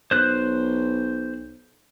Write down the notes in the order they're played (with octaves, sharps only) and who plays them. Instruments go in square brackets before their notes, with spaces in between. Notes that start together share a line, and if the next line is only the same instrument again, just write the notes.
[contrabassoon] B1 [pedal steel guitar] C5 F#6